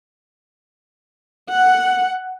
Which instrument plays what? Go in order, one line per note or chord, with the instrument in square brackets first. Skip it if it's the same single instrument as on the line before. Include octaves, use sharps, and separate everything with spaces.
[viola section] F#5